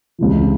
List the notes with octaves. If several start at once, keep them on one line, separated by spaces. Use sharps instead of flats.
C#2 C3 E3